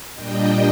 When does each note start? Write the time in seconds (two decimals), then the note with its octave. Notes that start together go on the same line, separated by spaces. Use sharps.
0.14 A#2 G3 D4 D#5 G5